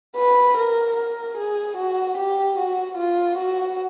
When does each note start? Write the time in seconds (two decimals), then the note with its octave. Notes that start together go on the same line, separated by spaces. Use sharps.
0.16 B4
0.57 A#4
0.96 A#4
1.37 G#4
1.77 F#4
2.17 G4
2.58 F#4
2.97 F4
3.37 F#4